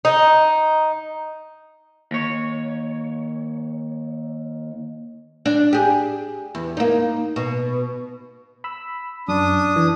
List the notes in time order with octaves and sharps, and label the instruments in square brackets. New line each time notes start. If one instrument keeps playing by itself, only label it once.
[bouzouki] D#4
[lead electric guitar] D#2 C#5
[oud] D4
G4 G#4
E2
A#3 D#4
B2
[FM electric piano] B5 E6
[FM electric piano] F#2 [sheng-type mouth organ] D4 D#6
[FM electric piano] E3